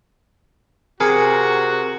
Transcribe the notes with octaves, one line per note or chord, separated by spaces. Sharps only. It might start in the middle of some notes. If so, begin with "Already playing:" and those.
C3 F#4 G#4 A#4